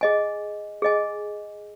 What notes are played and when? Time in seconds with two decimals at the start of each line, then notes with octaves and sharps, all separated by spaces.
0.01 G#4 D#5 G#5
0.82 G#4 D#5 G#5